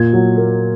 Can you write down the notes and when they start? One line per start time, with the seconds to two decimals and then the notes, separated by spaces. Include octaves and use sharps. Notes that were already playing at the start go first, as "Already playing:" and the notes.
Already playing: A#2 G#6
0.13 F#3
0.37 A#3